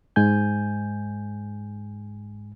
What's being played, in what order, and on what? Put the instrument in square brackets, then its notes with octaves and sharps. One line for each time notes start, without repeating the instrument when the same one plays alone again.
[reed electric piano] G#2 G#3 G#5 G6